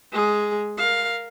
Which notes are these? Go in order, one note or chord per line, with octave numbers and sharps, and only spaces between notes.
G#3 G#4
A#4 F5